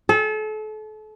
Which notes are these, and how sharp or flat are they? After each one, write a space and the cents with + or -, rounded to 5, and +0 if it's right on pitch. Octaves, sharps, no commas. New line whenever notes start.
A4 -35